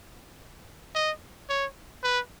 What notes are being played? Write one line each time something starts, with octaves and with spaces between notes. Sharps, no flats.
D#5
C#5
B4